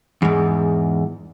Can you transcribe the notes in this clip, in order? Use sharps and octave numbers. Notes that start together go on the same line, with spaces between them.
E2 G#2